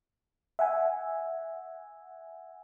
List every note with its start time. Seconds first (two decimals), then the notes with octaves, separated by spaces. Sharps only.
0.59 E5 F#5 G#5